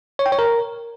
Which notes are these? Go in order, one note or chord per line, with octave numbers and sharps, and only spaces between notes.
C#5
G5
C#5
A#4